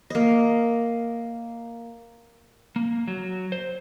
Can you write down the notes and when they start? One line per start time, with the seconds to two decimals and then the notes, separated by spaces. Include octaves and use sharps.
0.10 A#3 D#5
2.76 A#3
3.08 F#3
3.52 C5